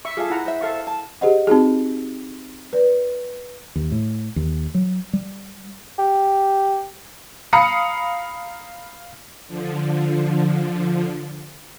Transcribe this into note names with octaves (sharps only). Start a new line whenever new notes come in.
E5 C#6
F4 G#4 A4 E5
E4 F#5 A#5
C5 E5
A4 F5 C#6
A5
G4 G#4 C5 D#5 F#5
C4 D#4 F#4 G#4
B4 D5
D#2
A2
D#2
F#3
G3
G4
F5 A#5 B5 D#6 C#7
D3 F3